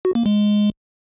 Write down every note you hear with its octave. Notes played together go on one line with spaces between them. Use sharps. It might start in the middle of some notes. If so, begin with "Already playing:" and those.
F#4
A#3
G#3